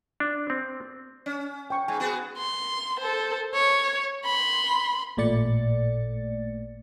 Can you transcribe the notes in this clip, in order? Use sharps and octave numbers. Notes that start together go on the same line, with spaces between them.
D4
C4
C#4
G5 C#6
G#2 G#5
B3 F#4 G#4
C6
A4 C5
C#5
B5 C6
A1 A#2 A3 D5 A6 C#7